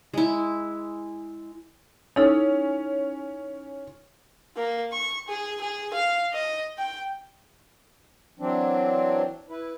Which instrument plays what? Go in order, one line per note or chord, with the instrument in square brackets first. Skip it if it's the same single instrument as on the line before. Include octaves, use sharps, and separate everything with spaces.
[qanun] G#3 E4
[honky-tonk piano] C#4 [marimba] D#4 E4 A4
[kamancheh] A#3
C#6
G#4
G#4
F5
D#5
G5
[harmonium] E3 F#3 C4 D4
E4 B4